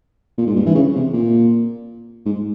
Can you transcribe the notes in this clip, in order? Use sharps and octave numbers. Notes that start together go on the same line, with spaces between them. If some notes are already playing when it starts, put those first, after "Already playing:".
A#2
G#2
G2
E3
C#3
C3
A#2
G#2